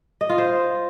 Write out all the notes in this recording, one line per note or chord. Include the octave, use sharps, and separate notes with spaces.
D#5
F4
C5